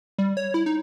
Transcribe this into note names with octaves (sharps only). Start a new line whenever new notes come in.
G3
C#5
E4
D#4